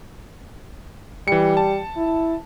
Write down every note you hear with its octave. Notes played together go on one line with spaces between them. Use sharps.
E3 G3 C#7
A5
E4